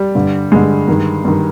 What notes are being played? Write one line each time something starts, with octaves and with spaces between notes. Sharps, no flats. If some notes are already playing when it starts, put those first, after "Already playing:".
Already playing: G3
G2 D3
G2 D3 G#3
G2 D#3
G2 D#3